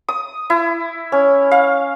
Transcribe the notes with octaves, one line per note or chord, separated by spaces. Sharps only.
D#6
E4
C#4
F5